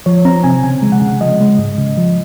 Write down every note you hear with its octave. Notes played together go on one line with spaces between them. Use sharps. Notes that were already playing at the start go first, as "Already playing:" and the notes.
F3 C#5
C4 A#5
C3 G#5
C#3 G#5
G#3
F#5
C#3
F3 D#5
G#3
G#2
C#3
F3